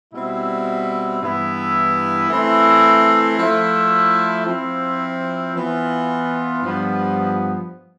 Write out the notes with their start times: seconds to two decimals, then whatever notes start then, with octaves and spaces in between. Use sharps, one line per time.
0.12 B2 G3 C4 E4
1.21 G2 E3 B3 E4
2.29 E3 A3 C4 E4
3.38 F3 A3 E4
4.46 F3 C4 E4
5.54 E3 B3 F4
6.62 G2 F3 B3